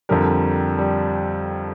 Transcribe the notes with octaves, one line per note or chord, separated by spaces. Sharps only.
F2 D3 G3 A#4
G3